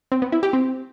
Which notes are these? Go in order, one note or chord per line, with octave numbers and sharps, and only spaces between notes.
C4
B3
E4
G4
C4